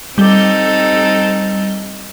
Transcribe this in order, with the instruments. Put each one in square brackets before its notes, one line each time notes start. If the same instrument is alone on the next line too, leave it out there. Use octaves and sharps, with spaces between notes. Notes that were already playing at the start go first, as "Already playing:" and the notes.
[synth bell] G3 G7 [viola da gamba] C4 D#4 A4